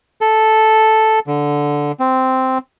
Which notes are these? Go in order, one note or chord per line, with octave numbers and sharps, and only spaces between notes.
A4
D3
C4